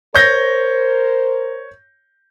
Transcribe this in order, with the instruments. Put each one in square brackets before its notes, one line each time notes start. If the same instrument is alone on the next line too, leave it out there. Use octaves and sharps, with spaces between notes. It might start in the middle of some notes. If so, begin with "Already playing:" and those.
[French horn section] A#4 C5 [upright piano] C#5 G6 A#6